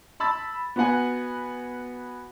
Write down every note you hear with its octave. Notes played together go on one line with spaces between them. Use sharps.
A5 B5 E6 A6
B3 F#4 B4 F#5 G#5